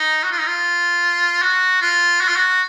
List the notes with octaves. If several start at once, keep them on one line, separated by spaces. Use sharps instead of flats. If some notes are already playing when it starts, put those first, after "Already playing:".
Already playing: D#4
F#4
F4
D#4
F4
F#4
F4
F#4
F4
F#4